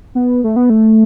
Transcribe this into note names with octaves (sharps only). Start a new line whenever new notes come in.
B3
A3
B3
A3